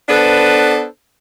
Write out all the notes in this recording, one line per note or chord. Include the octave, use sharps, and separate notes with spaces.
B3 D4 A4 B4 C5